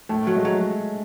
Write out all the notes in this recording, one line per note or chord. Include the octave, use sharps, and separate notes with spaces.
A2 A3
F#3
G#3
F#3